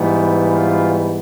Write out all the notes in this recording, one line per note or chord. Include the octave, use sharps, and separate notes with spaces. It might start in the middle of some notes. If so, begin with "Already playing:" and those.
Already playing: G#2 E3 G3 B3
F4